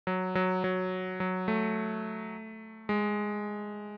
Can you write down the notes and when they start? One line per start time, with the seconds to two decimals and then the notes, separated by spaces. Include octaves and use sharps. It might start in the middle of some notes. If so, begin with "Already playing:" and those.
0.07 F#3
0.35 F#3
0.64 F#3
1.20 F#3
1.48 A3
2.89 G#3